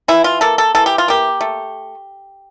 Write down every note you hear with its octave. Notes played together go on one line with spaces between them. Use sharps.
E3 E4
F4
A#3 A4
A4
E3 A4
G4
F4
A#3 G4
A3